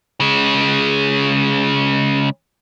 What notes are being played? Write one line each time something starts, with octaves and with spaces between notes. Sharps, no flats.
C#3 G#3